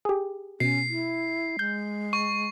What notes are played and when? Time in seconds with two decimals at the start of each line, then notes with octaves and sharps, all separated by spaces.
0.05 G4 G#4
0.60 B2 C#4 C7
0.89 E4
1.59 G#3 G6
2.13 C#6